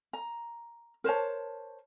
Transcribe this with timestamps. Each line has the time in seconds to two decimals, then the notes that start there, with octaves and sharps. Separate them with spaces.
0.13 A#5
1.04 A#4 C5 C#5 A5